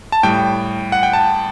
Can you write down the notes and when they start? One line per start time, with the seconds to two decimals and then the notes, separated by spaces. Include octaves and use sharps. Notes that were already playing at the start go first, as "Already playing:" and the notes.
0.12 A5
0.23 A2 G3 G5
0.92 F#5
1.03 G5
1.13 A5